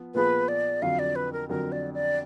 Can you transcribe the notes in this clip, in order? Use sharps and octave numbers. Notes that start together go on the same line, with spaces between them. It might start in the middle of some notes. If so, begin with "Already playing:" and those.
Already playing: F3 B3
A#2 F3 B3 F4 G#4 B4
D5
F2 D3 F#3 F5
D5
B4
A#4
F2 D3 F#3 A#4
D5
D5